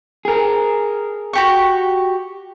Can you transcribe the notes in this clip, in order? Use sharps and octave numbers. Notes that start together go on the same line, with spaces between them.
G#4 A#4
F#4 G4 C#6